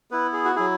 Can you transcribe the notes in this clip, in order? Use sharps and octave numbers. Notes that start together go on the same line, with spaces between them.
B3 E4 B4
G#4
F#4
F#3 E4 G#4